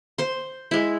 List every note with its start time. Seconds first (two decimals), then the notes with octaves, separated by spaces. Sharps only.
0.18 C5 C6
0.71 G#3 E4